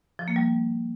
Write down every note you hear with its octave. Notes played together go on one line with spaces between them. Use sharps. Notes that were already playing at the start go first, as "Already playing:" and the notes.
F3
A#3
G3